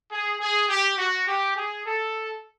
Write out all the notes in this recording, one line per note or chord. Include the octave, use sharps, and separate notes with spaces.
G#4
G#4
G4
F#4
G4
G#4
A4